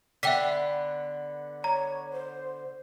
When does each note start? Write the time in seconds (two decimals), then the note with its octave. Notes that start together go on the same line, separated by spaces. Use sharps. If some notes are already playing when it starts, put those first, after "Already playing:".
0.23 D3 B3 E5 G5 B6
1.64 C#5 A#5
2.13 C5